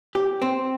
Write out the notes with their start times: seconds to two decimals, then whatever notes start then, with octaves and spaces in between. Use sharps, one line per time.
0.15 G4
0.42 C4